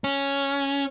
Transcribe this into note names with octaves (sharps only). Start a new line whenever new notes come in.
C#4